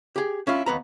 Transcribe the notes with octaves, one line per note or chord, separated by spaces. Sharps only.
G4 G#4
C#4 E4 F4
D#2 B3 B4 A#5